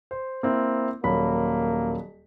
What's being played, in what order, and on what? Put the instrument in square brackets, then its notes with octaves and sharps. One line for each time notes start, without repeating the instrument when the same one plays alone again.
[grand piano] C5
A#3 C4 E4
[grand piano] D#1 F#3 B5 [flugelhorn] A#3